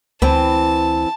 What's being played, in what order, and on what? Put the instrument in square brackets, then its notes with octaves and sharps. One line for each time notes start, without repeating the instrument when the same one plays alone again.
[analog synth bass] D2 [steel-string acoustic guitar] E3 C4 [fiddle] A5